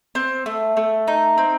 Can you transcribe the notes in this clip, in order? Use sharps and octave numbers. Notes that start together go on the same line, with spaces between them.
C4
A3
A3
D#4
C4